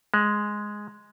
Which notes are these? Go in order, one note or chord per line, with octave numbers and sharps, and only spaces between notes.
G#3